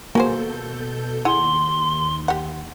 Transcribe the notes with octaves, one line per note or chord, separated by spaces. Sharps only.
B2 A#3 F#4 G#4 A4 C5 G6
D#2 E4 G#4 F#5 C6
G4 F#5